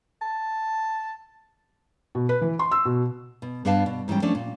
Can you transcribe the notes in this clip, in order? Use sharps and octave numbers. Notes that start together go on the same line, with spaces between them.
A5
B2
B4
E3
C6
E6
B2
B2
G2 B3 D4 B4 F5 A5
B2
G#2 E3 G3 C#4 G5
F3 A3 C#4 D4
A#2